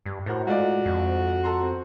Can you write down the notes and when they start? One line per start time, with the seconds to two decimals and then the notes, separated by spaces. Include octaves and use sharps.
0.06 G2
0.26 A2 F#4 A#4 C5
0.47 G#2 F4 F#4 D5
0.86 F2
1.44 A4 A#5 C6
1.61 C4